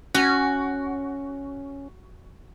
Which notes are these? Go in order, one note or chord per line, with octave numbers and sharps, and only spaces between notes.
C#4 F#4